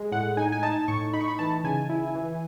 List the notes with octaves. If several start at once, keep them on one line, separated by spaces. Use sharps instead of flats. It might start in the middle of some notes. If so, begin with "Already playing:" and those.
Already playing: G#3
A2 F#5
D#4 G#5
G#5
D#4 A5
A2 C#6
D#4 B5
C#6
B5
E3 A5
C#3 G#5
E4
E3